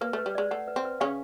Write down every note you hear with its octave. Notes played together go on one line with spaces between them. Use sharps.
A#3 B4
A3
B4
G3
G#3 D5
A3 F#5
B4
C4
B4
C#3 C#4 F5